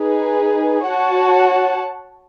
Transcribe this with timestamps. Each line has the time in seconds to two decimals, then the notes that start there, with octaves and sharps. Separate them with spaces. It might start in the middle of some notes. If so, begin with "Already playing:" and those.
Already playing: D#4 G#4 B4
0.85 F#4 C#5 F#5 A5